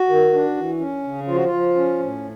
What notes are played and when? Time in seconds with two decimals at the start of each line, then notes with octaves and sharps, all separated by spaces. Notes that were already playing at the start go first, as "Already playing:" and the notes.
Already playing: F#4
0.09 D#3
0.33 D4
0.57 E3
0.80 C#4
1.04 C#3
1.28 F3 F4
1.36 F#4
1.45 F4
1.53 F3
1.76 C#4
1.99 A2